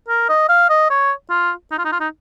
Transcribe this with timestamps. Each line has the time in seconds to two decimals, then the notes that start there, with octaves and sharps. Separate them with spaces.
0.09 A#4
0.29 D#5
0.49 F5
0.70 D#5
0.90 C#5
1.30 F4
1.71 D#4
1.79 F4
1.85 D#4
1.92 F4
2.00 D#4